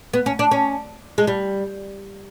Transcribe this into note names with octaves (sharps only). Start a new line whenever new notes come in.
B3
C#4
D4
C#4
G#3
G3